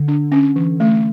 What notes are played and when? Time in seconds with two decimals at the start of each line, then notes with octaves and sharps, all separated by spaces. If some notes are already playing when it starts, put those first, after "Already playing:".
Already playing: D3
0.08 D4
0.32 C#4
0.56 E3
0.80 A3